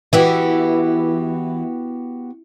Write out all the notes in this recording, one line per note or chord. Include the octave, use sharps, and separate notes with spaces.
E3 B3 F#4 G4